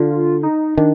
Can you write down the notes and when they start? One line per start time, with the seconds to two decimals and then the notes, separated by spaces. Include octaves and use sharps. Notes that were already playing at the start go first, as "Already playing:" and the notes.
Already playing: D3 F4
0.43 D#4
0.77 D#3 D4